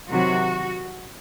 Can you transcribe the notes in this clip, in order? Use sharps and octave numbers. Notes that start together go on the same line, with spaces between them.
C3 D#3 F#3 F#4